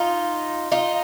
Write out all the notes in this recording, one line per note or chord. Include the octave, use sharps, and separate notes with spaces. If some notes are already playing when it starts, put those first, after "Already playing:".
Already playing: D#4 F4
D#4 F4